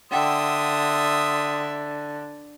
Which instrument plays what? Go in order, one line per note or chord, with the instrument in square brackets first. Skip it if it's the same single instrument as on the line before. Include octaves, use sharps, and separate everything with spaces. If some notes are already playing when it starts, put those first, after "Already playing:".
[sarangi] D3 [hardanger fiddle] E5 [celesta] F#5 G5 [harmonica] C6 D#6